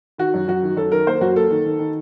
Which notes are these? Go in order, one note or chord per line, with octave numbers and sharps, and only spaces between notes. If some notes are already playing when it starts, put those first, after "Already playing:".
D#3 F#4
F#2
F#2 F#4
D#3
F#2 A4
D#3 A#4
A#3 C5
F#2 F#4
A#3 A4
D#3
D#3
D#3